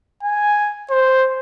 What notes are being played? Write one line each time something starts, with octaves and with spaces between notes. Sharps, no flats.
G#5
C5